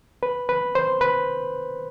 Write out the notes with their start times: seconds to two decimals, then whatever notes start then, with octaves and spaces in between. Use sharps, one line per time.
0.23 B4
0.49 B4
0.75 C5
1.01 B4